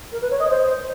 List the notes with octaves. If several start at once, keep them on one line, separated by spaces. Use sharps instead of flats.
A#4
B4
C#5
D#5
C5